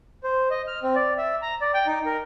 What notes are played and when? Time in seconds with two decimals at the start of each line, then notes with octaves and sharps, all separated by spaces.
0.23 C5
0.51 D#5
0.67 F6
0.83 C4
0.96 D5
1.18 E5
1.42 A#5
1.61 D5
1.74 G5
1.87 D#4
2.06 A#4